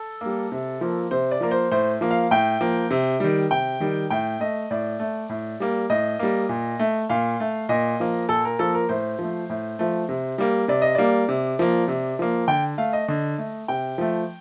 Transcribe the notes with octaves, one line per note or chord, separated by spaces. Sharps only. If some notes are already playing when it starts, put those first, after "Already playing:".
Already playing: A4
G3 A#3
C3
F3 A#3
C3 C5
D5
F3 A#3 A#4
C5
A2 C5
F3 A#3
F5
A2 G5
F3 A#3
C3
D#3 G3
C3 G5
D#3 G3
A2 G5
A3 D#5
A2 D5
A3
A2
G3 A#3
A2 D#5
G3 A#3
A#2
A3
A#2 F5
A3
A#2 D#5
F3 A#3
A#2 A4
A#4
F3 A#3 A4
A#4
A2 C5
F3 A3
A2
F3 A3
C3
G3 A#3
C3 D5
D#5
G3 A#3 D5
C3
F3 A#3
C3
F3 A#3
D3 G5
A3 F5
D#5
D3 D#5
A3
C3 G5
F3 A3